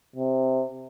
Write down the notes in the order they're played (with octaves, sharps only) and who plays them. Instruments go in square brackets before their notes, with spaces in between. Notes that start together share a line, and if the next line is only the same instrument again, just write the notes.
[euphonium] C3